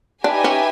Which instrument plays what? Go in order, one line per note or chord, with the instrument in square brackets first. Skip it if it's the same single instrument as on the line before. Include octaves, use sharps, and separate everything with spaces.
[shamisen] D4 [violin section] D#4 G4 B4 E5 G#5
[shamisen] C#4